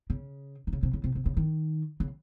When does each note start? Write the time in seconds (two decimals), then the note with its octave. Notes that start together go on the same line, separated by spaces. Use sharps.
0.10 C#3
0.67 D#3
0.73 C#3
0.83 C3
0.93 C#3
1.04 C3
1.15 C3
1.26 C#3
1.37 D#3
2.00 C#3